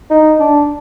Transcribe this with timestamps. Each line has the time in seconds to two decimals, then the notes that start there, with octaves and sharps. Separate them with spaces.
0.10 D#4
0.40 D4